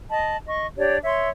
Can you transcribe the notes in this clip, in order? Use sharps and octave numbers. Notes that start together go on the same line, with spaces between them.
D#5 A5 B5
D#5 C#6
D4 G4 C#5 D5
C#5 E5 C6